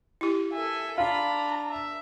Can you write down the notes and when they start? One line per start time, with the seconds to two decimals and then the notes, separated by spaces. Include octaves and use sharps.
0.21 E4 G4
0.53 A4 E5 G#5
0.98 D4 F4 A#5 B5
1.71 E5